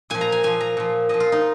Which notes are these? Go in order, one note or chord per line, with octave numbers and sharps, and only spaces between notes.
A#2 F3 G#5
A#5
G#5
A#2 F3 G#5
A#5
A#2 F3
A#2 F3 D#5
F4
D#4